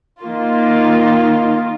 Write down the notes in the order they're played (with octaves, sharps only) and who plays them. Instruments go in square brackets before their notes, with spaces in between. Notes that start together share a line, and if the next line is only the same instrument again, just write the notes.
[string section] D#3 A#3 F4